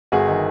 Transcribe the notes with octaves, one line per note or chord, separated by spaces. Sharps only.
G1 F#4 G#4
D#3